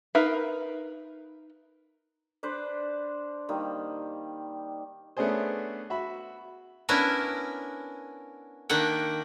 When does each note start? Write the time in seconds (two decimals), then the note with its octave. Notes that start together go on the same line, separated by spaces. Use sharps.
0.15 D#4 A#4 B4 E5 F5
2.43 D4 B4 C5 D5
3.49 D#3 G3 A#3
5.17 A3 B3 C#4 D4 G#4 C5
5.90 F#4 E5 B5
6.89 B3 C#4 D4 E4 A#4 E5
8.69 D#3 A#3 D4 E5 F#5 G5